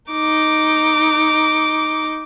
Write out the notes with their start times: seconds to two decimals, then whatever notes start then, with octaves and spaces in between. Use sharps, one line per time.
0.11 D#4 D6